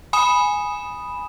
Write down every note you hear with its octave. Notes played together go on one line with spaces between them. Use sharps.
G#5 B5 D#6 E7